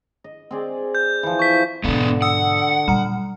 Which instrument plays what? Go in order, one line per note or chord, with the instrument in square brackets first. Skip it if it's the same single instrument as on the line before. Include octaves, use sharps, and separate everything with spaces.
[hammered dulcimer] D#5
C4 G#4 D5
[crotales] G6
[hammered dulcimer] E3 F3
[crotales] C#6 B6
[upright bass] G#2 B2 [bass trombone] D3 [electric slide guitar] G#3 B3
[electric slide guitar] F#5 [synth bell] D#6 E6 C#7
[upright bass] A#2 F#3 [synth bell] G3 A#5